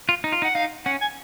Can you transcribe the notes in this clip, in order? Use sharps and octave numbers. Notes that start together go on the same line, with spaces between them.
F4
D#4
F4
D#4 F#5
D#4 F5
C#4 F#5
G#5